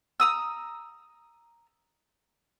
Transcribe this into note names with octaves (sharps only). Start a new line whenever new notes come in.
A#5 D#6 E6